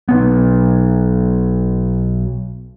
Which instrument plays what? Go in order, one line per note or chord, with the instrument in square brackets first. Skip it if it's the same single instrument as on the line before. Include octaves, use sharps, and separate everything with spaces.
[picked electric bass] B1 B3